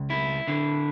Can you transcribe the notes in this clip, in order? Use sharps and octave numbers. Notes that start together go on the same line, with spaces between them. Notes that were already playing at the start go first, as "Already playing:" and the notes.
Already playing: C#2
E4
D3